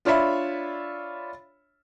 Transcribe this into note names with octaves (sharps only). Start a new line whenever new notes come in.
D4 F4 C#5 E5 B5